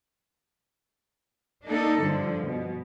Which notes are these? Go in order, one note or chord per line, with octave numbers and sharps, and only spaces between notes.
A#3 D4 D#4 A4
G2 D3 F3
B2